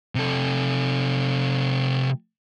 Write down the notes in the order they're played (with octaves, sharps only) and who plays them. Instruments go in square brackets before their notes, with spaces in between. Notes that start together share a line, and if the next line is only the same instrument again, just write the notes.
[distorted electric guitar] C3 A4